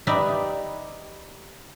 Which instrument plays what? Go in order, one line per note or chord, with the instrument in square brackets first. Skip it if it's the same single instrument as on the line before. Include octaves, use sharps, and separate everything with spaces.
[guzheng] D#4 G4 B4 D5 E5